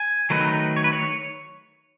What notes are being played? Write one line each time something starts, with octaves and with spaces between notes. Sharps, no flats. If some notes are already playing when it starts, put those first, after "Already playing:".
Already playing: G#5
D#3 F#3 A3 D#4 B4
C#5
B4
C#5